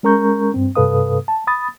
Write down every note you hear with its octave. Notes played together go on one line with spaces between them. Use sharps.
G#3 C#4 A#4 A#5 C#6 G6
G2 C4
G2 C3 A4 B4 F5 D#6
A5
B5 D#6 A6